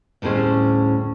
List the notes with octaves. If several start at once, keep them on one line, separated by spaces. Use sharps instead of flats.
D2 A2 G3 C#4 G#4 C5